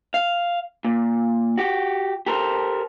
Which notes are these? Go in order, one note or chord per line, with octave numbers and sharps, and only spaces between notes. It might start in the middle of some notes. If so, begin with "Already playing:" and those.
F5
A#2
F#4 G4
G4 A4 A#4 C5